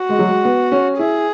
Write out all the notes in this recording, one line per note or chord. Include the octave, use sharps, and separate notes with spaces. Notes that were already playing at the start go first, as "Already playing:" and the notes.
Already playing: F#4
G#3
F#3
G#3
B3
C#4
E4 G#4